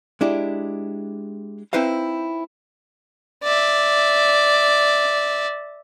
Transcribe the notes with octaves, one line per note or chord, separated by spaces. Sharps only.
G#3 D4 E4 G4
C4 D#4 E4 B4 C5 F5
D5 E5